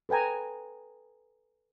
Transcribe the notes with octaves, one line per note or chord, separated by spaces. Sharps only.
A4 B4 G5 G#5 A#5